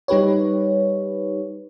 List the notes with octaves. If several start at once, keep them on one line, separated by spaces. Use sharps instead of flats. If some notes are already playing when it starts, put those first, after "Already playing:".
G3 D#4 G4 B4 C#5